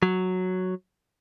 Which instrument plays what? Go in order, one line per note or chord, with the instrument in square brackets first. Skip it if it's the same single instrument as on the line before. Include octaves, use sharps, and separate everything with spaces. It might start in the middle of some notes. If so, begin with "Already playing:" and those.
[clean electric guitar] F#3